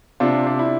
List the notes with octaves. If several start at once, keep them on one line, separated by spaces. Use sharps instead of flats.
C3 D4 F4
D4
E4